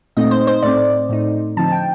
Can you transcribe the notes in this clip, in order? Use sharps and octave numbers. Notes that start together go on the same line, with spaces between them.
A#2 A3 C4 D#4 D#5
C5
C5
A2 A3 C4 D5
A2 A3 D#4
D3 F3 C4 D#4 A5
G5